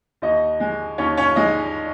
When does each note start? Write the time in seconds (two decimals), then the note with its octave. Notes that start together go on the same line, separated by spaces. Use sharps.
0.22 D#2 D#4 D#5
0.60 G#3
0.98 D#2 C#4 C#5
1.17 C#4 C#5
1.36 G#3 D#4 D#5